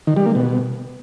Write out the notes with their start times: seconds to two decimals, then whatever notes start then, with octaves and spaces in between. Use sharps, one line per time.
0.07 D#3
0.17 G3
0.26 A#3
0.35 B2